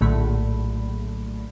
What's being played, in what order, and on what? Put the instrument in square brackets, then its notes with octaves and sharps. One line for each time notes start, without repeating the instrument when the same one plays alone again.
[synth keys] A#1 A2 D3 F#3 A3 B5